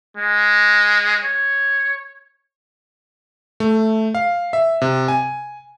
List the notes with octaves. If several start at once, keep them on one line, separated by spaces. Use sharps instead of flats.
G#3
C#5
A3
F5
E5
C3
G#5